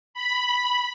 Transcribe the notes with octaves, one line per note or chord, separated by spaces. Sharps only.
B5